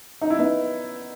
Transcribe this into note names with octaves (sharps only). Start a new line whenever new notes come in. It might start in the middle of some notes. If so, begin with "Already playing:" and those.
D#4
E4
B3 D#4